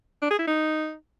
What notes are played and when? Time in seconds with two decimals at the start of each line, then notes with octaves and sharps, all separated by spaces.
0.22 D4
0.30 G#4
0.39 E4
0.47 D#4